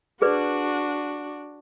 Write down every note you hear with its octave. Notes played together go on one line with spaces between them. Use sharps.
D4 F#4 G#4 B4 D5